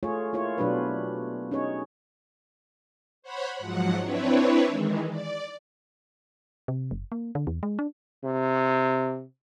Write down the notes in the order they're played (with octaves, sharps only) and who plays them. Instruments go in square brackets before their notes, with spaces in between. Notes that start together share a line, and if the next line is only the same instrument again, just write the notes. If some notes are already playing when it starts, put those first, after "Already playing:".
[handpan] A3 F4 G#4 C#5
A#3 E4 F4 C#5
B2 F#3 D4 F4 G4 B4
C#4 D#4 G#4 C#5
[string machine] C5 C#5 F#5 B5
G#2 F3 F#3 F#5
C4 D4 E4 B4 C#5
D#3 E3 G#3
D5
[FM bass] C3
F#1
A#3
D3
E2
G#3
D4
[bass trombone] C3